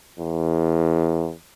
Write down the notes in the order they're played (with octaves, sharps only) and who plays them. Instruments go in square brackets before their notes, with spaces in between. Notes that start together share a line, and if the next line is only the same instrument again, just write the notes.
[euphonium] E2